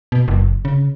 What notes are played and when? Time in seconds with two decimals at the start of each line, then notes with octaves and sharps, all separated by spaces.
0.12 B2
0.28 F#1
0.65 C#3